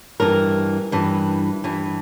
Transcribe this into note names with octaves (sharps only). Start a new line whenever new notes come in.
G2 E3 A#4
G2 E3
G2 E3